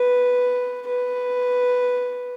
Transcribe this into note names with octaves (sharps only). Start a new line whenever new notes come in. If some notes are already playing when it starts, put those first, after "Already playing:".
Already playing: B4
B4